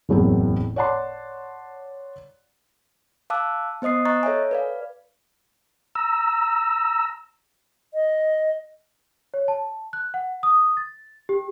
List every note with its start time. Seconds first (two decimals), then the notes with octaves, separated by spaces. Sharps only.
0.09 F#1 E2 A2 F#3 C4 A#4
0.76 C#5 D5 F#5 A5 C6 D6
3.30 F5 A5 D6 E6 F#6
3.82 B3 C5 D#5 D#6 C7
4.05 D#5 A#5 C#6 F#6 A6
4.23 A4 C#5 E5 G#5
4.51 B4 D5 F5
5.95 A#5 E6
7.94 D#5
9.34 C#5
9.48 A5
9.93 F#6
10.14 F#5
10.43 D#6
10.77 A6
11.29 G4